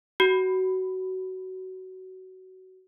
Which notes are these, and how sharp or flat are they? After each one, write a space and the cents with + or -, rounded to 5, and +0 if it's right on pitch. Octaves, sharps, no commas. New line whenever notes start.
F#4 +20